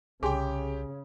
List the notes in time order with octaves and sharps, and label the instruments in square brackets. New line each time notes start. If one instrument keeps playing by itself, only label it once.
[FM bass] C2 [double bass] C#3 [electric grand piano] G4 G5 [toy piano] G#4 G#5 C6